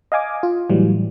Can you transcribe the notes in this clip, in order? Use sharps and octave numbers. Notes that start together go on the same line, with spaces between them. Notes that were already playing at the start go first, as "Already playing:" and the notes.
D#5 F5 G#5 D6
F4
A2 E3 F#3 G3